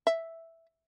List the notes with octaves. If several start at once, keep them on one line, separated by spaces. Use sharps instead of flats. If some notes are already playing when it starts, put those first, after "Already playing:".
E5